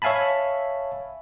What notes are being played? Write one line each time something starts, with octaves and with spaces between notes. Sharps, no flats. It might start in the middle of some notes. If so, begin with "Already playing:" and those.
C#5 E5 F5 G#5 A5 B5